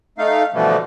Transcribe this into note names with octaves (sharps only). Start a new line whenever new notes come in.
A3 D#4 F5
B2 D3 E3 F3 G3 A3